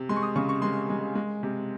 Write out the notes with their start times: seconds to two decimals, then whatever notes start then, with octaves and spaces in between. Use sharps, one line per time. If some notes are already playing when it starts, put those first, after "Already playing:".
Already playing: C3
0.09 G#3 C6
0.16 C#6
0.23 D#6
0.36 C#3 C#6
0.49 C#6
0.62 G#3 C6
0.90 G#3
1.15 G#3
1.43 C3